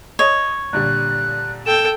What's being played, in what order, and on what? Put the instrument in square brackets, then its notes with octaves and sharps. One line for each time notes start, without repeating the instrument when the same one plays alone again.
[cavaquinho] C#5 [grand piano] D#5
[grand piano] A#2 D3 G3 [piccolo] F#6
[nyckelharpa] A4 G5 [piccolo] E7